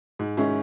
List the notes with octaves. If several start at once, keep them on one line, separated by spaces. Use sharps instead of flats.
G#2
D#3 G#3 C#4 E4